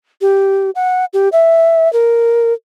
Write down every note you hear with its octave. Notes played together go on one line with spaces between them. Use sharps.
G4
F#5
G4
E5
A#4